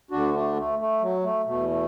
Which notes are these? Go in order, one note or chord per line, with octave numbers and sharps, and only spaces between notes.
D2 D3 D4 F#4
A3 D4
A3
A3
F#3
A3
E2 B2 A3
A3